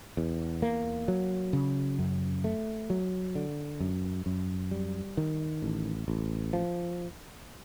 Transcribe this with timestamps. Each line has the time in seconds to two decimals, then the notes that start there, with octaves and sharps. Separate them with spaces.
0.17 E2
0.62 A#3
1.08 F#3
1.53 C#3
1.99 F#2
2.44 A3
2.90 F#3
3.35 D3
3.80 F#2
4.26 F#2
4.71 G3
5.17 D#3
5.62 A1
6.08 A1
6.53 F3